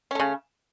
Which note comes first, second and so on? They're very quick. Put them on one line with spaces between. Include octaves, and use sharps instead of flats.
C#4 A3 C#3